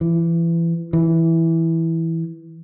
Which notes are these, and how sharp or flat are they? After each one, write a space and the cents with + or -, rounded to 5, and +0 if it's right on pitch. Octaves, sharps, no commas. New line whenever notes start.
E3 +25
E3 -5